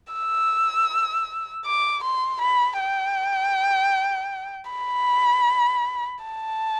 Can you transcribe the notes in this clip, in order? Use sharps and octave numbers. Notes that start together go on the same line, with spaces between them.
E6
D6
C6
B5
G5
B5
A5